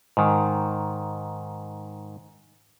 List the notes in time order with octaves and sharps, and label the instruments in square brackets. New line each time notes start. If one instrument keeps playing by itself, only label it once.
[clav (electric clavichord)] G#2 D#3